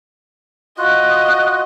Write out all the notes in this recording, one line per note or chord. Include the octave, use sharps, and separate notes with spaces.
F4 F#4 D#5 F#6